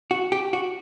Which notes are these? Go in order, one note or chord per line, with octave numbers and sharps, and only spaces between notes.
F#4
G4
F#4